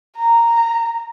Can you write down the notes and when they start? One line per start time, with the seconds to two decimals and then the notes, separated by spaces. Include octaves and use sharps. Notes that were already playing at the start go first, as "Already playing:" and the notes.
0.17 A#5